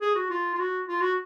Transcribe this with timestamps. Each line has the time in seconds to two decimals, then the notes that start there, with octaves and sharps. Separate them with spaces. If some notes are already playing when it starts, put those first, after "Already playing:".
0.01 G#4
0.15 F#4
0.30 F4
0.55 F4
0.59 F#4
0.88 F4
1.01 F#4